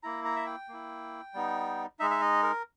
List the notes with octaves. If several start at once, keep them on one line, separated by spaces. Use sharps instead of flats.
A#3 E4 A#5
A#5
E5
G5
A#3 E4
G3 B3 D#4
G#3 D#4 E5
E5
D#5
A#4